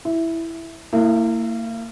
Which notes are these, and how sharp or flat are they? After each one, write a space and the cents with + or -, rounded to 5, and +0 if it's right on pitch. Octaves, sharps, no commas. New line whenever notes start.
E4 +0 E5 +0
A#3 -35 E4 +0